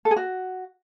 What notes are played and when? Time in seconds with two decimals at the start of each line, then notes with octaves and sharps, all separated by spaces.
0.05 A4
0.11 G#4
0.16 F#4